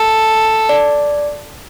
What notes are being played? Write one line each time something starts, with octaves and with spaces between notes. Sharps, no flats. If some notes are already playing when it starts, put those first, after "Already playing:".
Already playing: A4
D5